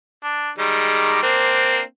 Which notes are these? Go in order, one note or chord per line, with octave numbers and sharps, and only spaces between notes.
D4
D#3 G3 G#3
A#3 C4 D4